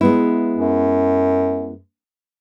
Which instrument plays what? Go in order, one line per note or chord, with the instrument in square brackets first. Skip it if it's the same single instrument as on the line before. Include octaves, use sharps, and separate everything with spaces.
[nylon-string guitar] G#3 B3 E4
[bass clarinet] F#2